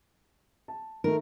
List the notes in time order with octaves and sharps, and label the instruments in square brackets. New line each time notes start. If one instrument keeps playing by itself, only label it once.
[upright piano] A5
[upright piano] D#3 A3 [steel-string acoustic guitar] A#4